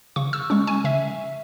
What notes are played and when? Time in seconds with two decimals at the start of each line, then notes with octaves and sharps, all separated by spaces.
0.16 C#3 C#6
0.33 E6
0.50 G#3 C#4 C#6
0.67 G#5
0.84 C#3 E5